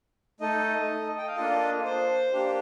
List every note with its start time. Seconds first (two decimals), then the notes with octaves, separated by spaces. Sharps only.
0.40 A3 D#4 A4 D#5
1.18 G5
1.27 F5
1.36 A#3 D4 F4 A4 D#5
1.85 C5
2.32 A#3 D4 G4